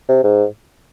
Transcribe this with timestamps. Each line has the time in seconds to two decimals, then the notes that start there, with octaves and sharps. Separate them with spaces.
0.09 C3
0.24 G#2